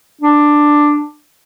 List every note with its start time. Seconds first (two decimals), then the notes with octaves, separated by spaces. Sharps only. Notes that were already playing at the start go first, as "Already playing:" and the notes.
0.21 D4